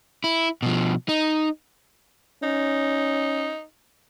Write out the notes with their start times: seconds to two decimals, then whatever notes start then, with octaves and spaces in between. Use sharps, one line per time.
0.24 E4
0.63 B2 F3
1.09 D#4
2.43 C#4 D#4